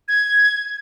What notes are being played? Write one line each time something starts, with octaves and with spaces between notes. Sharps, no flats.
G#6